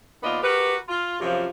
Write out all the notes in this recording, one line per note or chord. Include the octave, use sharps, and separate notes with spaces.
D#2 B3 F4 D5 D#5
F#4 G4 A#4 B4
F4
F#2 C3 F3